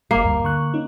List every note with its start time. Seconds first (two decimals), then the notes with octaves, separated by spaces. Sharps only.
0.11 G1 A#3 D6 C7
0.24 D2 G2
0.44 D3 C#6 F#6
0.74 C#4 D#4